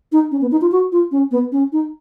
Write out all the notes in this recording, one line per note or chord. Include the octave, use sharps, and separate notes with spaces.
D#4
C#4
B3
D#4
F4
F#4
F4
C#4
B3
C#4
D#4